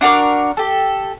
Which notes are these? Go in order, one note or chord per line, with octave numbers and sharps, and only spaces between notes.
D4 F#4 A#4 D6
G4 A4